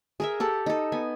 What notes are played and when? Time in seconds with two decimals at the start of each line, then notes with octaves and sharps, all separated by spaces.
0.20 G#4 A#4 E5
0.40 G4 A4 F#5
0.66 D#4 A4
0.92 B3 G#5